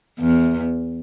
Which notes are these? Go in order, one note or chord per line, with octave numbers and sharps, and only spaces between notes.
E2